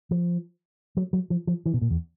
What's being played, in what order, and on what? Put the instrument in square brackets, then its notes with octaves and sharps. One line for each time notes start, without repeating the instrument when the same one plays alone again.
[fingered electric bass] F3
F#3
F#3
F3
F3
E3
B2
A#2
E2